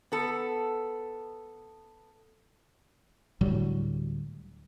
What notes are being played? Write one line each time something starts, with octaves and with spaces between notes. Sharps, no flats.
B3 A4
D2 A2 F#3 G3